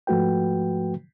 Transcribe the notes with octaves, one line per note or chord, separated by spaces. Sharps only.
G#2 F3 A3 F#4 B4 G5